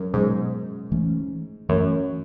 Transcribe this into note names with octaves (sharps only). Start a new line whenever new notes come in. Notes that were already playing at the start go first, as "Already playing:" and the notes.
Already playing: F#2
G#2 B2 F#3 B3
E3 A3 C#4
F#2 E3 A3 C#4